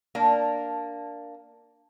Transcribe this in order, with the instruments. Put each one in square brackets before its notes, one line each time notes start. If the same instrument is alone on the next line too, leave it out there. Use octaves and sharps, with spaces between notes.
[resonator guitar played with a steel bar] A#3 D4